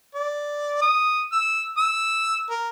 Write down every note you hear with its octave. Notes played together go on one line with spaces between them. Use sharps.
D5
D#6
E6
E6
A#4